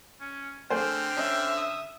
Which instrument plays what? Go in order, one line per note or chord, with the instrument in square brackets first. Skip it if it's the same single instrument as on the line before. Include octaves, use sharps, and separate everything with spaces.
[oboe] C#4
[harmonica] D3 C4 F6 [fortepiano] A3 G#4 C5 [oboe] G5
[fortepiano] C#4 [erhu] E5
[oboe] D#6